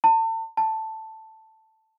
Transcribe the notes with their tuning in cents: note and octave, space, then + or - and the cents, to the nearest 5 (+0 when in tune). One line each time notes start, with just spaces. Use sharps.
A5 +35
A5 +5